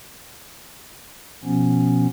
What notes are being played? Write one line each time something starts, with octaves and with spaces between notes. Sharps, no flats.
B2 F3 B3 C#4